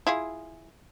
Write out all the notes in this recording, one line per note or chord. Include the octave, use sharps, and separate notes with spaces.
E4 F4 G#4